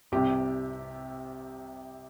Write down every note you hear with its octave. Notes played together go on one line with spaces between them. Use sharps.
C2 C3 G4